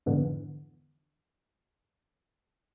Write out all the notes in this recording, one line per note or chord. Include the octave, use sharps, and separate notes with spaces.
F2 G#2 D3 E3 B3